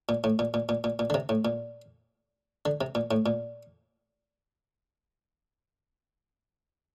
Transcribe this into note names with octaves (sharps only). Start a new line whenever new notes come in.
A#2
A2
A#2
A#2
A#2
A#2
A#2
D3
C3
A2
A#2
D3
C3
A#2
A2
A#2